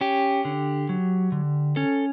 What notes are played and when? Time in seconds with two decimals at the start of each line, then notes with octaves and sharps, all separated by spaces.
0.01 C#4 G4
0.45 D3
0.89 F#3
1.32 D3
1.76 C#4 A4